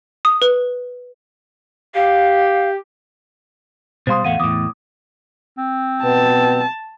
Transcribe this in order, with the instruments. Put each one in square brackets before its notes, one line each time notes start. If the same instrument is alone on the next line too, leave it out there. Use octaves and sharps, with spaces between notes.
[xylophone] D#6
B4
[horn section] G4 [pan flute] F5
[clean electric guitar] B2 G3 C6 [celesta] C5 F5 D#6
[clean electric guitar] E2 A2 A3 [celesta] F5 F#5 D#7
[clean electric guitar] E2 A2 [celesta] D6 D#6
[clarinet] C4
[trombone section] B2 B3 [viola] A5